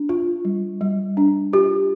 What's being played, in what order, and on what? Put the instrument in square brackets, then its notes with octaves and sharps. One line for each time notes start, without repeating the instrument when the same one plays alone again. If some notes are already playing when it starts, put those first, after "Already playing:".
Already playing: [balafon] D4
F4
G3
G3
D4
F4 G4